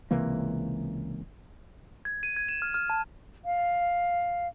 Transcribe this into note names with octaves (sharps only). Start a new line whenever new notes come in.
C#2 C3 E3 A#3
G#6
D#7
G#6
E7
F6
F6
A5
F5